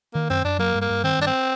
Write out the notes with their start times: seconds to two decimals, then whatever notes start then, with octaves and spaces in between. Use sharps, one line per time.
0.14 D#3 A#3
0.30 F#2 C4
0.44 F#2 D4
0.59 F#3 A#3
0.75 G2
0.81 A#3
0.90 G2
1.04 D#3 C4
1.19 G2 D4
1.27 C4